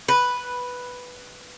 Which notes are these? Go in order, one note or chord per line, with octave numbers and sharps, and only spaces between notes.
B4